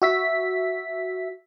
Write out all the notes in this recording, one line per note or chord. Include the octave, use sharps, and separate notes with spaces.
F#4 E5 B6